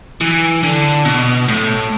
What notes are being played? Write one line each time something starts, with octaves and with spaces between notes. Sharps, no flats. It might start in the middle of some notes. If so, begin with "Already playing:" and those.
E3
D3
B2
A2